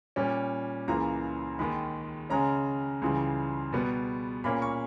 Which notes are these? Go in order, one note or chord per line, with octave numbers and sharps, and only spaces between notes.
A#2 G3 C#4
C#2 C#3 E3 A#3 A#5
D#2 D#3 G#3 B5
C#3 G#3 C#4 A#5
C#2 C#3 E3 G3
B2 G3 B3
A#2 A#3 C#4 B5
C#6